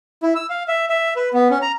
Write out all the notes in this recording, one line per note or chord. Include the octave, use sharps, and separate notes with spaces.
E4
E6
F5
E5
E5
B4
B3
C#4
A#5